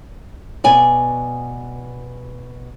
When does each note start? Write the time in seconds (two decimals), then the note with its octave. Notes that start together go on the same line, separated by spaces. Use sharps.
0.64 B2 D5 G#5